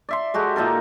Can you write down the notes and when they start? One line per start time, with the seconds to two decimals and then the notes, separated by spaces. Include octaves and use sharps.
0.09 D5 E5 C6
0.34 G#3 F#4 G4 A4
0.56 A#2 D#4 A4 A#4